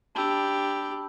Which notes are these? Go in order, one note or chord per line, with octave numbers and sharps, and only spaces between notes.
D4 G4 A5 B5 E6